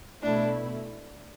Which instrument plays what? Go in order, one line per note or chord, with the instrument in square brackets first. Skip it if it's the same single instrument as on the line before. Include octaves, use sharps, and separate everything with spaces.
[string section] B2 A3 E4 [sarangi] D4